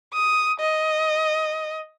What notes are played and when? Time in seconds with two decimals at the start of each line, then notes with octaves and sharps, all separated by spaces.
0.13 D#6
0.60 D#5